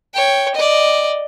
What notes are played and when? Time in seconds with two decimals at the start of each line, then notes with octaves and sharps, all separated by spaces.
0.14 C#5 G5
0.55 D5 D#5